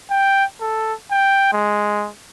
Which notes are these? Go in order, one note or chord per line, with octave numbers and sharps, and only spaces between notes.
G5
A4
G5
G#3